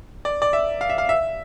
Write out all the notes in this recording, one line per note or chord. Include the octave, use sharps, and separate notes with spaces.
D5
D5
E5
F5
E5
F5
E5